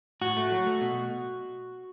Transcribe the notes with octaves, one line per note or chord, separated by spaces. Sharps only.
A2 F#4
A3
F#3
A3
B2